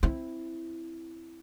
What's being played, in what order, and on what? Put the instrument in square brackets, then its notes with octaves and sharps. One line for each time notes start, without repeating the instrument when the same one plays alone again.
[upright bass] C4 E4